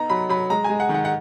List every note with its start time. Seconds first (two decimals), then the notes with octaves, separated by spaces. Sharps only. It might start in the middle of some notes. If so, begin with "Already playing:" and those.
Already playing: B3 D#4 A#5
0.10 F#3 B5
0.29 F#3 B5
0.50 G#3 A#5
0.64 G#3 G#5
0.80 F#5
0.89 D#3
0.94 F#5
1.05 F#5